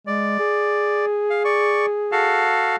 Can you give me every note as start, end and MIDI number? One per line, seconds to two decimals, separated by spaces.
0.07 0.36 56
0.07 1.06 74
0.39 2.52 68
1.30 1.43 77
1.45 1.86 74
1.45 1.86 85
2.12 2.76 66
2.12 2.76 69
2.12 2.76 77